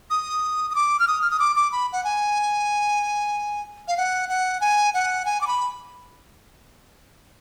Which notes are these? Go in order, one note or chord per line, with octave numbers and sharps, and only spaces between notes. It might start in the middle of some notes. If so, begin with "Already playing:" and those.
D#6
D#6
D6
F6
D#6
F6
D#6
D6
D6
B5
F#5
G#5
F5
F#5
F#5
G#5
F#5
G#5
D6
B5